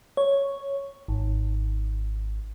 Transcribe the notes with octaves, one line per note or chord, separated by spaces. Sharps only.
C#5
G#1